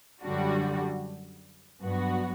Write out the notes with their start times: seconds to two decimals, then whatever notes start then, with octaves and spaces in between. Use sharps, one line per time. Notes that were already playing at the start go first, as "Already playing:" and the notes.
0.22 F#2 D3 G3 D4 F#4
1.81 G2 F#3 B3 F#4